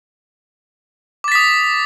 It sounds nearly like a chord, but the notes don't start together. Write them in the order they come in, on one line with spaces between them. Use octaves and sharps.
D6 A6 B6 D#6